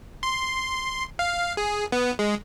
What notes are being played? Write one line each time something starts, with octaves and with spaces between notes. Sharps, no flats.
C6
F5
G#4
B3
G#3